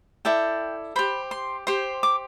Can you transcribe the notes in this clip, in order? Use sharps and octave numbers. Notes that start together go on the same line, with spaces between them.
E4 A4 D5 G5
G4 C5 B5
C6
G4 C5 C6
D6